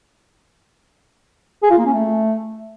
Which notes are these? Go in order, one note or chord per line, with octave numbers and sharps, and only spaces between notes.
G#4
F4
A#3
C#4
A3